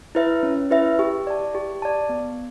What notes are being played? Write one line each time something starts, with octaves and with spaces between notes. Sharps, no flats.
E4 B4 E5
C#4
E4 B4 E5
G4
D5 A5
G4
D5 A5
B3